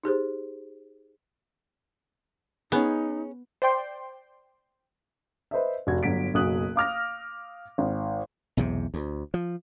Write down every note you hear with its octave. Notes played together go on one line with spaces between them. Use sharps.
D#4 G4 G#4 C5
B3 C#4 D#4 G#4
C5 D5 G5 C6
B4 C5 D#5 E5
F1 F#4 G#6
G1 F#3 B6 D7
F#1 B1 F#4 D#6 F#6 F#7
F5 D6 F6 A#6
G#1
B1 E2 G#2 C3
D2
F3